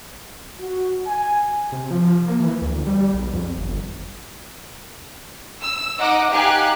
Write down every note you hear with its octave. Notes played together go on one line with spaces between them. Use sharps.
F#4
G#5
C3
F3
A#3
E3
D2
G3
B1
F2
G1
E6
D#4 D#5 F#5 D6
D#4 G4 F5 G#5 F#6